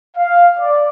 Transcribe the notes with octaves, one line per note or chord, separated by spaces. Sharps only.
F5
D5